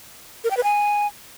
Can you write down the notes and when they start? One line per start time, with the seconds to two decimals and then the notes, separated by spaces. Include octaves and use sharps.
0.44 A#4
0.51 G5
0.57 B4
0.63 G#5